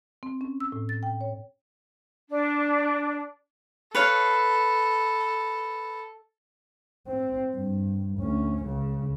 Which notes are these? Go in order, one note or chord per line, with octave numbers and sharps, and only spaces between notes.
C4
C#4
E6
A2
A6
G5
C#5
D4
A4 B4 C#5 F5
C4
G2
D2 C#4
C#2 C#3